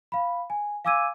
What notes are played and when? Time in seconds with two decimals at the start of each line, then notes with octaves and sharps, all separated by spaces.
0.12 F5 B5
0.50 G#5
0.85 F5 G#5 D6 E6 G#6 D#7